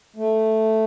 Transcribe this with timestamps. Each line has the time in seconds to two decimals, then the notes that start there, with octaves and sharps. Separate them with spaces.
0.16 A3